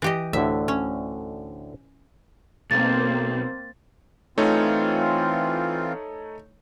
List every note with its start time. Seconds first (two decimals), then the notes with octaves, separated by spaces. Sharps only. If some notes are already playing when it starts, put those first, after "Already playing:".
0.02 E3 G4 D#5
0.33 D2 A2 D3 E5
0.68 C#4
2.71 B1 A#3 C4 C5 A6
4.38 E3 A3 C4 D#4 F4 C#5